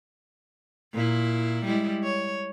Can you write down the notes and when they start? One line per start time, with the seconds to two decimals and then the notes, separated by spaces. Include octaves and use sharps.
0.93 A#2 E4
1.65 G3 G#3 E4
2.04 C#5